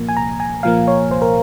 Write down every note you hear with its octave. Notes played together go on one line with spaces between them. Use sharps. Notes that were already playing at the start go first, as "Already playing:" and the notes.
Already playing: C2 A#2 F3 A#3
G#5
C2 A#5
G#5
A#2 F3 A#3 F5
C#5
C2 C5
A#4